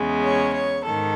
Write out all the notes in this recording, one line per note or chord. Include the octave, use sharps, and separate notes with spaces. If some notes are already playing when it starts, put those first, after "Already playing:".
Already playing: E2 C#3 G#3
C#5
C#5
G#2 D#3 A4